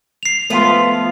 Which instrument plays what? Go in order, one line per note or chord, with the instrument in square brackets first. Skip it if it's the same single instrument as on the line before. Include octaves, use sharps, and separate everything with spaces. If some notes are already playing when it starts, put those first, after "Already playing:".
[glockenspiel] C7 F7
[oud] F3 B3 B4 [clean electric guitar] A3 F4